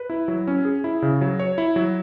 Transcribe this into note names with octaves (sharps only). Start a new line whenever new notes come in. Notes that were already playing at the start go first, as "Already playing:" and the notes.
Already playing: B4
E4
F#3
C#4
G#4
E4
C#3
F#3
C#5
E4
F#3